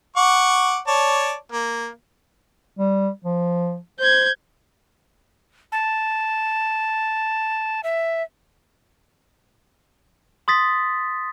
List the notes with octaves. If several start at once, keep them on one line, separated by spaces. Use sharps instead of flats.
F#5 C#6 D6
C#5 D5 A5
A#3
G3
F3
C5 G6 G#6
A5
E5
C6 D#6 A6 B6